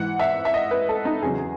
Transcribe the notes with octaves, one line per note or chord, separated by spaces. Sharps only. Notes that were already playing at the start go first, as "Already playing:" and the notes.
Already playing: G#2 E3 F#5
E5
E5
D#5
B4
A4
D#4
E2 C#3 F#3 G#4